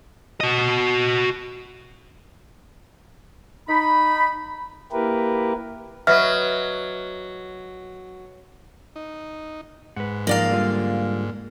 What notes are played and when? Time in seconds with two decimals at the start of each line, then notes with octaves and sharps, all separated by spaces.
0.40 F#4 D#5
3.69 D#4 B5
4.92 A#3 E4 G4 A#4 B4
6.07 F#3 B4 D#5 E5 F6
8.96 D#4
9.96 G#2 B4 F#5
10.27 F3 A#3 D#4 D5 F5 A#5
10.51 D3 G3 F4